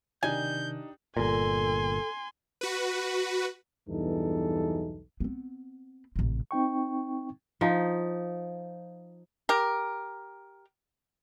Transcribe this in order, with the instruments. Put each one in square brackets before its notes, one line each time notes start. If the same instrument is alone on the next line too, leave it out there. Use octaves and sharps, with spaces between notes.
[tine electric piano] C3 D#3 [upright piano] D4 D#4 G4 [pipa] G#5 [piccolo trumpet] G6
[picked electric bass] G1 A#2 [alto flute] A4 [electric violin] G#5 C6
[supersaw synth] F#4 B4
[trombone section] B1 E2 G2 E3 D#4 A4
[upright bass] B3 C4
A1 C3
[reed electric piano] C4 D#4 G5 C#6
[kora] F3 D#4
[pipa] G4 A#4